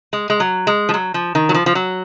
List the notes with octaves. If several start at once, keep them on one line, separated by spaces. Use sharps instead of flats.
G#3
G#3
F#3
G#3
F3
F#3
F3
D#3
F#3
F3
F3
F#3